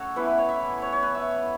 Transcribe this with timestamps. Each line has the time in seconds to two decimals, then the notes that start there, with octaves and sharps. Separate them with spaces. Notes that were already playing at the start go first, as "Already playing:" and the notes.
Already playing: A3 C#4 F#4 A4 C#5
0.16 E3 B3 E4 B4
0.27 B4
0.38 C#5
0.49 E5
0.82 C#5
0.92 C#5
1.03 B4
1.15 E5